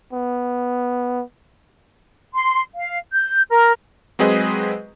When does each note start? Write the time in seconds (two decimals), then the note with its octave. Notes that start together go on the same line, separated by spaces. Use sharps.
0.13 B3
2.34 C6
2.74 F5
3.13 G6
3.51 A#4
4.19 F#3 G#3 C4 G#4 B4 D#5